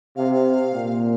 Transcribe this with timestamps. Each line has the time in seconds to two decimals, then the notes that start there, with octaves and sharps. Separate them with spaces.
0.16 C3 F5
0.73 A#2